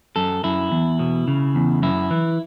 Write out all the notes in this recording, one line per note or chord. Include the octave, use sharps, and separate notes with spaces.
F#2 A4
F#2 E4
E2
B2
C#3
E2
F#2 E4
E3